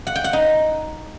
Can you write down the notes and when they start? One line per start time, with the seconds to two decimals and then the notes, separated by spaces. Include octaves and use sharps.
0.07 F#5
0.15 G5
0.24 F#5
0.33 D#4